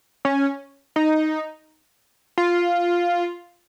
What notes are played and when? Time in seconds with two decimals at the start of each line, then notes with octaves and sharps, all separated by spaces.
0.25 C#4
0.96 D#4
2.38 F4